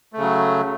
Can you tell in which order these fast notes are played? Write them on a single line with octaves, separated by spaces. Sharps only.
A3 C#3 F#3